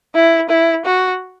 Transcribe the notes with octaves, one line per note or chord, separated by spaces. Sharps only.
E4
E4
F#4